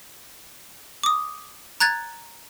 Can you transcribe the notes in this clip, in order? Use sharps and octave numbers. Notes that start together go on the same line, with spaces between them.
D6 D#6
A#5 F#6 G#6 A6